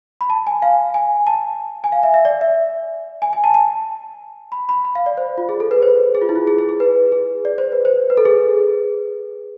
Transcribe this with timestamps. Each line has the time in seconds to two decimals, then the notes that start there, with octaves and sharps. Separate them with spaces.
0.21 B5
0.30 A5
0.47 G#5
0.62 F5
0.94 G#5
1.27 A5
1.84 G#5
1.92 F5
2.03 E5
2.14 E5
2.25 D5
2.41 E5
3.22 G#5
3.33 G#5
3.44 A5
3.54 A5
4.52 B5
4.69 B5
4.85 B5
4.95 F5
5.06 D5
5.17 C5
5.38 F4
5.49 G#4
5.60 A4
5.71 B4
5.82 C5
6.15 G#4
6.22 F4
6.29 E4
6.36 F4
6.47 G#4
6.58 G#4
6.69 G#4
6.80 B4
7.12 G#4
7.45 D5
7.58 C5
7.72 B4
7.85 C5
8.10 B4
8.17 A4
8.25 G#4